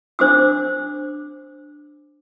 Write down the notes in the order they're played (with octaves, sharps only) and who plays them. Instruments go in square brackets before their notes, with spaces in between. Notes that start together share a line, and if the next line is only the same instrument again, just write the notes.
[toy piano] D4 C5 D6 E6